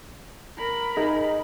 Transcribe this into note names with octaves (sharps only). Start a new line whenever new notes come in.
A#4 B5
D#4 G#4 D#5